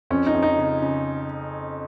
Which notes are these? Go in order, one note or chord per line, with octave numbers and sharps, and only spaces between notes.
F2 C#4
D#4
F2
D#4
C#3
C#3